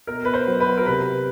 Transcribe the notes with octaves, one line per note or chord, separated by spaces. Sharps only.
B2 A#4
B4
C5
F#3
B4
A#4
C3 B4